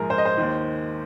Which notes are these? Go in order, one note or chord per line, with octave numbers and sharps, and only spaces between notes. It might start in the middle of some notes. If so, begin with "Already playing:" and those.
Already playing: A#1 G#2 F3 G#4 A#4
C5
D#5
C5
D#2 D#3